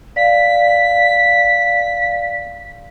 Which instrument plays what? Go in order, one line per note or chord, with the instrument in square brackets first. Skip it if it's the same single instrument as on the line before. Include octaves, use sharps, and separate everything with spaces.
[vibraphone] D5 F5 [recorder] B6